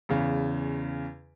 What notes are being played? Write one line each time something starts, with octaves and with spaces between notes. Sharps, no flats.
E2 C#3